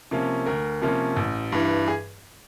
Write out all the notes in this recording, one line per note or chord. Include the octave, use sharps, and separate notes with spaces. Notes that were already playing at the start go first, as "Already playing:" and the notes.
C3 F3 A#3 C#4
D2 A#4
C3 F3 A#3 C#4
A1
G2 E3
G#4